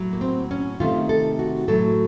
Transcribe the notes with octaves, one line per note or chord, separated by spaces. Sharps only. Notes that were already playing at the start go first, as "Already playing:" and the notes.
Already playing: A2 F#3
A#3
C4
C#4
C3 D#3 A3 F4
A4
F#4
A2 F#3 A3 A4